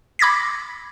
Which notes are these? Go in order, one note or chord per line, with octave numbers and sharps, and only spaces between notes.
B5 D6 G#6 A#6 B6